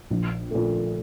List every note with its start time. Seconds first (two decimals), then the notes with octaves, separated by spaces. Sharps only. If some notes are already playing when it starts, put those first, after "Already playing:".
0.10 A#1
0.51 A#2 A3